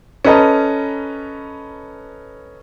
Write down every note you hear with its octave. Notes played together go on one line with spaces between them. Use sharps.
C#4 A4 B4 D#5 A5 A#5